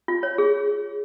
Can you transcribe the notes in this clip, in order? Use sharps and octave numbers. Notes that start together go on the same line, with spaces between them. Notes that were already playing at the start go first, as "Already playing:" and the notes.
F4
C#5
G#4